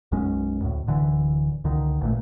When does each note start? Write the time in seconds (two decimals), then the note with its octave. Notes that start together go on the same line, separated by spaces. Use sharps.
0.12 B1 F#2 G#3 C#4
0.62 D2 A2
0.87 D1 D3 E3
1.64 C#2 D3 D#3
2.01 A1 A#2 A3